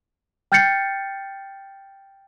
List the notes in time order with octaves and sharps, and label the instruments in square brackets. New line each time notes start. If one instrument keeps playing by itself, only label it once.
[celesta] G5 F6 G6 A6 C7 C#7